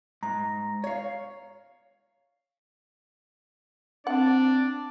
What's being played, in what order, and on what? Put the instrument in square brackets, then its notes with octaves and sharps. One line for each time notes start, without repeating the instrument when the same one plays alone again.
[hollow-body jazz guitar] G#2 [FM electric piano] A#5
[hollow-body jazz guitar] C#5 F5
[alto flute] C4 [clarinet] D4 [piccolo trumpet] D5 [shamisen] F#5